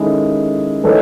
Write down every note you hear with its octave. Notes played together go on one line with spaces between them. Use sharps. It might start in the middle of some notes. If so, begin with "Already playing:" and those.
Already playing: D#3 G#3 C#4 E4 A4
E3 A3 D#4 A4 C#5